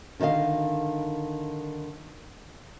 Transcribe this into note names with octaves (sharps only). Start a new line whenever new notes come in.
D3 D#3 C5 D#5 F5